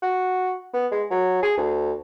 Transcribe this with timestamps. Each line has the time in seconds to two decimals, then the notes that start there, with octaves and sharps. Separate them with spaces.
0.02 F#4
0.74 B3
0.92 G#3
1.10 F#3
1.43 G#4
1.57 D2